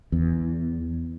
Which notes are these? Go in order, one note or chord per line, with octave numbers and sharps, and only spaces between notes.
E2